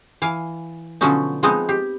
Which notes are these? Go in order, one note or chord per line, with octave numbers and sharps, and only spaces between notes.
E3 F5 G#5
B2 D3 F3 F#3 C#4 D#4
F3 G#3 B3 C4 D#4
G4